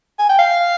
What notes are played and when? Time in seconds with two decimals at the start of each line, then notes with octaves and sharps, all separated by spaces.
0.19 G#5
0.29 G5
0.39 F5